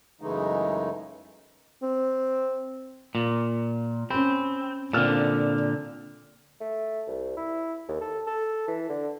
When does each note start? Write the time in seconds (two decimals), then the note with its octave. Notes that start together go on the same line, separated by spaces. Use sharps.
0.21 F#2 C#3 E3 G#3 A3 D#4
1.82 C4
3.15 A#2
4.10 C4 C#4 B5
4.93 A#2 D3 C4 F6 E7
6.61 A3
7.07 C2
7.37 E4
7.88 D#2
8.01 A4
8.27 A4
8.68 E3
8.89 D3